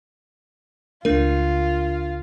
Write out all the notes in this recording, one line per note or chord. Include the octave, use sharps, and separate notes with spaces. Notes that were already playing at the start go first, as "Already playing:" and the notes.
C#2 A3 D4 F4 A#4